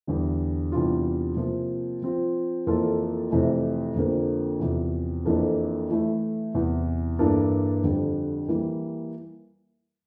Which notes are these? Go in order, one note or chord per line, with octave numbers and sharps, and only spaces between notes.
E2 D3 G3
E2 C3 G3 D4 F4
C3 F3 A#3 F4
F3 C4 F4
F2 E3 A#3 F4 A4
F2 C3 E3 A3
F2 D3 F3 A#3
E2 C3 F3
F2 E3 A#3 D4 A4
E3 A3 E4 A4
E2 C3 E3
G2 E3 A#3 D4 A4
F2 D3 G3
E3 G3 A#3